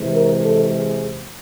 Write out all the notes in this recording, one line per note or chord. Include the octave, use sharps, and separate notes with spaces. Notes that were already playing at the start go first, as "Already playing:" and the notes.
Already playing: C3 E3 G#3
A#4
A4
G#4